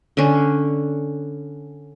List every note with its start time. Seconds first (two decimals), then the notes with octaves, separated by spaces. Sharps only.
0.17 D3 C#4